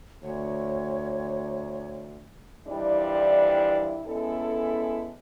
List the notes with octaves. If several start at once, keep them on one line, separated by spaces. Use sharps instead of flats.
D2 C#5
F2 E3 G3 D4 E4 D5
G#3 B3 C#4 E4 A4